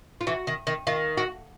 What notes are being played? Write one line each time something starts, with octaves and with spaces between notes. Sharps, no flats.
F4
E3 F#4
D#3
D#3
D#3 F4
F#4